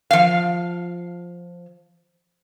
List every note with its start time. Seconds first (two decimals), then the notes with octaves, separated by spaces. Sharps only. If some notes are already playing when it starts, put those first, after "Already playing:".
0.11 F3 F5